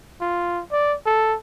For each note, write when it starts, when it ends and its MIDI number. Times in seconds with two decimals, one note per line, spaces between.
0.21 0.62 65
0.72 0.96 74
1.06 1.36 69